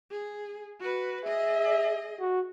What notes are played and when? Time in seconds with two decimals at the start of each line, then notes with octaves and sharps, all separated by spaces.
0.11 G#4
0.80 F#4 B4
1.25 G#4 D#5 E5
2.20 F#4